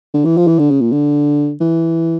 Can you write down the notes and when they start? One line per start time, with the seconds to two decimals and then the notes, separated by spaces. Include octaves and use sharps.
0.14 D3
0.25 E3
0.37 F3
0.47 E3
0.59 D3
0.71 C#3
0.81 A#2
0.92 D3
1.60 E3